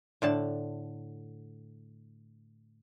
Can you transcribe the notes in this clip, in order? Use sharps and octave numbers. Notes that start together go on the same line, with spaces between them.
A2 D3 A5